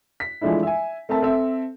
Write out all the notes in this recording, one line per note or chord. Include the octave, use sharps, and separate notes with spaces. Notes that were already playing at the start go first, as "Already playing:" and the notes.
B6
E3 F3 G#3 A3 D4 E4
E5 G#5
A3 C4 A#4 E5 A5
C4 A4 E5